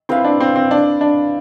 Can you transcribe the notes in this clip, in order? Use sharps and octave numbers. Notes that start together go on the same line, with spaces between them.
C4 E4 B4 F5
D4
C4
C4
D4
D4